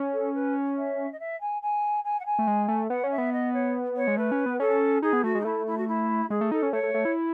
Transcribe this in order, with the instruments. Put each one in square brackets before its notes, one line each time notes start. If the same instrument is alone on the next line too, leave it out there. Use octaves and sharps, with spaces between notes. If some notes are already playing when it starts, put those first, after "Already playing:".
Already playing: [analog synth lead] C#4
[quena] A4
B4
E5
D#5
E5
G#5
G#5
G#5
F#5
G#5
[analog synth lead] A3
G#3
A3
[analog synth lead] B3 [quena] F#5
[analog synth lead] C#4
[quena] E5
[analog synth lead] B3
[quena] D#5
C#5
C#5
[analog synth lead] G#3
[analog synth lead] A3 [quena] B4
[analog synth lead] C#4
B3
[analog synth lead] C#4 [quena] A4
[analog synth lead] D#4 [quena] G#4
[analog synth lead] B3
[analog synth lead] A3 [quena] F#4
[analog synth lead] G#3
[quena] D#4
[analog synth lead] A3 [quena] E4
[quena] E4
F#4
E4
[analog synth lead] G#3 [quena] G#4
[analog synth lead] A3
[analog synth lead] D#4 [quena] A4
[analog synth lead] C#4
[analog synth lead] A3 [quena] C#5
[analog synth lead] A3
A3
E4